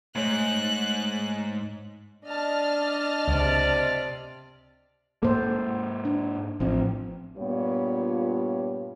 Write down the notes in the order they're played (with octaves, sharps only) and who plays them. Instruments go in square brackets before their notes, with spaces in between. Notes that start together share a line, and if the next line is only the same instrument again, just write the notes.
[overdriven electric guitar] G#2 [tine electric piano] A3 C#5 [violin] F#6
[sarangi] D4 [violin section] D#5 A5 F6
[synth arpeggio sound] C#2 [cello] C3 D5
[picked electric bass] G#2 A#3 [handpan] A4 C5
[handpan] D4
[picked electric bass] A1 [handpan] F3 C4
[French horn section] G2 A#2 B3 F4 G4 C#5